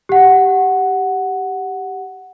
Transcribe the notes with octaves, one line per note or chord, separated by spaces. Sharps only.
G4 F#5